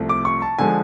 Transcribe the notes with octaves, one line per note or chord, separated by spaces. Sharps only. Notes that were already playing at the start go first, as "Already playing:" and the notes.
Already playing: C2 C3 F3 A3
D6
C#6
A5
D3 F3 G#3 G#5